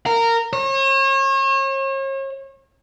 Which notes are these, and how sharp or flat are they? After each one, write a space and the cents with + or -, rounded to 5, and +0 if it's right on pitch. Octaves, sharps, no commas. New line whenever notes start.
A#4 -15
C#5 -40